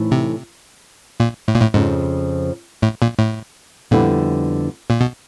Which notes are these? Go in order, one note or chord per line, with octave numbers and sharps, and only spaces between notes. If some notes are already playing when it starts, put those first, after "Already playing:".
Already playing: A2 E3 A3 C4 D#4
C3
A#2
A2
A#2
A2
F2 G#2 C#3 F3
A2
A#2
A2
F2 A#2 D3 G3 B3 E4
A#2
B2